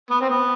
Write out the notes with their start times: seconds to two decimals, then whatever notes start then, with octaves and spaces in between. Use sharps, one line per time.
0.10 B3
0.20 C4
0.29 B3